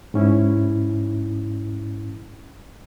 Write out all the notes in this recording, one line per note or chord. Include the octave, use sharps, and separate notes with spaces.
G#2 C#4 E4